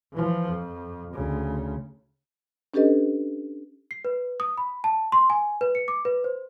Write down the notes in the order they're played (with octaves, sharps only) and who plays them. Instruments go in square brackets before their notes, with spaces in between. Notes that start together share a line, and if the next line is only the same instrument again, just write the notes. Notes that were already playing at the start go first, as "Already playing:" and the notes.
[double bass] E3 F3
F2
D2 C#3
[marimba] C#4 D4 G4 A4 B4 D#5
[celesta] C7
B4
D#6
B5
A5
C6
G#5
B4
C#7
D6
B4
C5